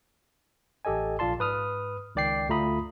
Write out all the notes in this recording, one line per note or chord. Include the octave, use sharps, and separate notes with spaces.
A1 G4 A4 D#5 G#5
A#1 F4 D5 A5 C6
G#2 B4 D#6 F6
C#2 D#3 D5 G5 C7
D2 A3 F4 A#5 B5 D#6